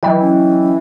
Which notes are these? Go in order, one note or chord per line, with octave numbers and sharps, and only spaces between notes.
E3 F#3 D#5 G5
C#4